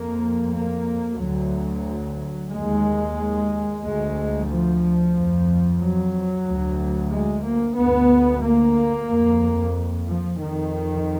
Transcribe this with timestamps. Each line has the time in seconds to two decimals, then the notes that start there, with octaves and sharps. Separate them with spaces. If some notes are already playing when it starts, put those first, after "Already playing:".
Already playing: F2 A#3
0.52 A#3
1.18 D2 F#3
2.50 D#2 G#3
3.82 D2 G#3
4.47 F3
5.13 F2
5.80 F#3
6.46 D2
7.11 G#3
7.44 A#3
7.77 D2 B3
8.44 A#3
9.09 F2
10.07 F3
10.41 F2 D#3